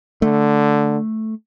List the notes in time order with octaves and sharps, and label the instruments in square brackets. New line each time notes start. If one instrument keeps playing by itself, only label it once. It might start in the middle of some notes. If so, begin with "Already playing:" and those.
[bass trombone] D3 [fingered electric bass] A3